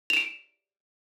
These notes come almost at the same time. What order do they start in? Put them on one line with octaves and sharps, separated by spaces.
F7 E7 D7